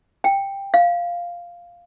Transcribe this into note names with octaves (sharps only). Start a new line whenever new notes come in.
G5
F5